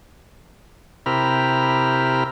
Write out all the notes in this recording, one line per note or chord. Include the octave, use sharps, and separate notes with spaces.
C3 E4 G4 A#4 B5 F6